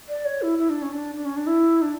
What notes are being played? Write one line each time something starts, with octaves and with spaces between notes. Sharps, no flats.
D5
C#5
E4
E4
D4
C#4
D4
D4
C#4
D4
E4
D4